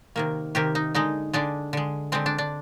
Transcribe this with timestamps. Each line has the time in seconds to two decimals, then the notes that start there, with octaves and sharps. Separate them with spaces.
0.16 C3 D#3 A#3
0.55 C3 D#3 A#3 G4
0.75 D#4
0.94 D3 G#3 D#4
1.33 D3 G#3 D4
1.73 D3 G#3
2.12 D3 G#3 C4
2.26 D4
2.38 D4